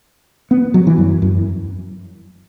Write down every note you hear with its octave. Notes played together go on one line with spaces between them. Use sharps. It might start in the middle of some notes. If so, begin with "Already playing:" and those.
B3
F#3
E3
F#2
F#2